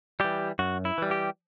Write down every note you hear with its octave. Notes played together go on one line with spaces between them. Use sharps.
E3 G3 G4
F#2 F#4
E4
E3 G3
G4